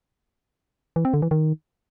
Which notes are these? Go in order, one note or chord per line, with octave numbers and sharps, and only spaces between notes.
E3
C4
D3
E3
D#3